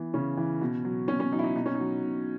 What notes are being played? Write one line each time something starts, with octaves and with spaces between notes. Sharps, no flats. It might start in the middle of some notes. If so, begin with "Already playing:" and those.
Already playing: E3 B3
C#3 C#4
E3
B2
F#3
B2 C#4
C#4
F#3 D#4
E4
D#4
B2 D#4
C#4
F#3 D#4
B2